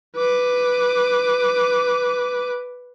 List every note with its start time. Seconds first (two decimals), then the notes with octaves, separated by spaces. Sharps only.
0.16 B4 D6